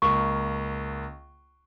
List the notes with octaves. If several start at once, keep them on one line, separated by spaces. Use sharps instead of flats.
C#2 A#3 C#6